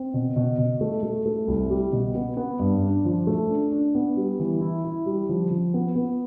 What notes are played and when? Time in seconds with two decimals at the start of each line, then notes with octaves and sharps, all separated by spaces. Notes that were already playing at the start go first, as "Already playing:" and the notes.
Already playing: C4
0.14 B2
0.36 B2
0.58 B2
0.81 A3
1.03 A3
1.26 A3
1.48 C2
1.70 G3
1.92 B2
2.15 B3
2.37 B3
2.59 G2
2.83 D4
3.05 F3
3.27 A3
3.49 D4
3.72 D4
3.95 B3
4.17 G3
4.39 E3
4.61 E4
4.84 E4
5.06 G3
5.29 F3
5.51 F3
5.74 B3
5.95 B3